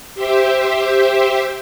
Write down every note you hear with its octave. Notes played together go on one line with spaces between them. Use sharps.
G4 C5 E5